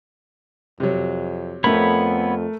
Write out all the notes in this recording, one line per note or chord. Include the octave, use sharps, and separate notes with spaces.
F2 C3 F#3
F2 A3 B3 A#4 C#5 B5